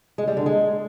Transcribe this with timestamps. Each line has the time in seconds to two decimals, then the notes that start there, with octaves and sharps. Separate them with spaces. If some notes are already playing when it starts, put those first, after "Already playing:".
0.18 G#3
0.27 G3
0.37 D3
0.46 G#3